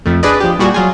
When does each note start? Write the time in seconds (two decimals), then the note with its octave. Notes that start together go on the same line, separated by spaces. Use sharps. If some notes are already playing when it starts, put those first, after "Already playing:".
0.06 F2 A3
0.23 D4 G#4 B4 D5 D#5
0.40 F3 G4
0.59 A#2 G3 F#4 G#4
0.74 F#3 F4 G#4